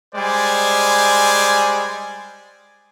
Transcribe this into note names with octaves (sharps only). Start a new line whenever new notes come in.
G3 G#3 C5 D5 G#5